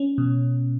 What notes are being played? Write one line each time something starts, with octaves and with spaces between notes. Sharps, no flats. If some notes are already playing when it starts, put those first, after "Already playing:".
Already playing: C#4
B2